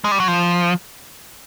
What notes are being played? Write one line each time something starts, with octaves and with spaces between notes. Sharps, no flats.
G#3
G3
F#3
F3